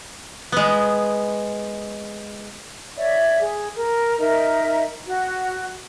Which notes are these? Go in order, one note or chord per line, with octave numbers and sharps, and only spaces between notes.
G#3 B3
C#5 D5 E5
G#4
A#4
D#4 A#4 D#5 E5
F#4